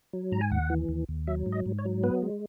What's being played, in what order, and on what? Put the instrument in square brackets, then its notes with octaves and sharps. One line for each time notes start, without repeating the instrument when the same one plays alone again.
[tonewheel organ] F#3
G#2 A#5
G#5
D#2 F#5
E3
D#2
D#2
F#3 E5
G#2
D#5
G#2
C#5
F#3
B3 B4
G#3